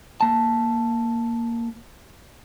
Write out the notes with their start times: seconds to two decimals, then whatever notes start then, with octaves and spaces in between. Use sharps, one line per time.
0.21 A#3 A5